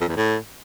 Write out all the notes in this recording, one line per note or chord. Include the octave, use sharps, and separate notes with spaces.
F2
E2
A2